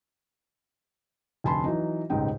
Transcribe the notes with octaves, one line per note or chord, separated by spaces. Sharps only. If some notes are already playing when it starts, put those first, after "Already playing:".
F1 D2 G#5 A5 B5 C6
E3 F#3 D#4
D#1 C#2 G#2 D#4 G5